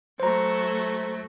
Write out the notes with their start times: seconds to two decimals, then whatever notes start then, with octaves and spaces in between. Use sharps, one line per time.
0.20 F#3 A3 C5 A#5